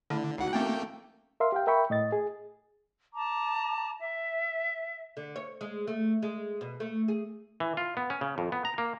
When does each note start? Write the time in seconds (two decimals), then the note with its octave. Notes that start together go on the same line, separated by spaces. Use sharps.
0.10 D3 A3 E4 A5
0.38 C#2 D#4 F#4 F#5
0.53 A3 A#3 C4 C#4 G5 D6
1.40 A#4 E5 F5 C6
1.52 G4 F5 G5
1.67 A#4 E5 G5 B5 C#6
1.90 A2 D#5 A6
2.12 G#4
3.14 A5 A#5 D6
4.00 E5
5.17 D3
5.36 C#5
5.61 G#3
5.88 A3
6.23 G#3
6.61 B2
6.80 A3
7.08 G#4
7.60 E3
7.77 F4
7.97 B3
8.10 C#4
8.21 C#3
8.38 F2
8.52 B3
8.65 A#5
8.78 A#3